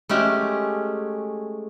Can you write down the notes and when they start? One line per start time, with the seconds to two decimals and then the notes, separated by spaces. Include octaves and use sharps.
0.09 G#3 A3 C#4 G4